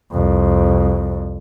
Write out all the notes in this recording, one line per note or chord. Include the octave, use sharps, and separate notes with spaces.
C2 F2